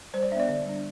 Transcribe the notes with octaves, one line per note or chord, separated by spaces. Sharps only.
G3 C5
D5
B3 D4 D5 E5
D3
G3 D4